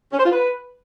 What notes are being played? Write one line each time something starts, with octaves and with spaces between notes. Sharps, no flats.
C#4
C5
F4
B4